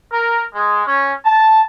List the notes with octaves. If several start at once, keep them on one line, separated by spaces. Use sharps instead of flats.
A#4
G#3
C#4
A5